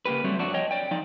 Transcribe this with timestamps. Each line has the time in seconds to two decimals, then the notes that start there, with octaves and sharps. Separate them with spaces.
0.05 C#3 A#3 G4 B4
0.24 F#3 G3 A3 C4 F#4
0.38 F2 F#3 D4 F#4
0.54 C#5 D#5 G5
0.71 D5 G5
0.91 F3 D#4 D5